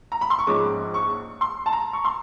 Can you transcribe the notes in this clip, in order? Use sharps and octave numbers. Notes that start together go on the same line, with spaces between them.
A#5
B5
C6
C#6
A#1 G#2 F3 G#3 C#4 D6
C#6
C6
A5
A#5
C#6
C6